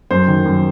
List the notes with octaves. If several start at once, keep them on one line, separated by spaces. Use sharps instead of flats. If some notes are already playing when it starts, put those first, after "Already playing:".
F#2 C5
D#3
F#2